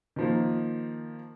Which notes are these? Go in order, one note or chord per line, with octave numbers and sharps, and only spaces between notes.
D#3 F3 A#3